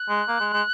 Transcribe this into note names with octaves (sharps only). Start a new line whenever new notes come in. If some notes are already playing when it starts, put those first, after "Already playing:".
Already playing: F#6
G#3
A#3
G#3
G#3